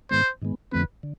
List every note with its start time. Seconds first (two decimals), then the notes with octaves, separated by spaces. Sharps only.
0.10 G#2 D#3 G#3 B3 C5
0.42 G#2 D#3 G#3 B3
0.72 F2 D3 F3 A3 C4 B4
1.03 D3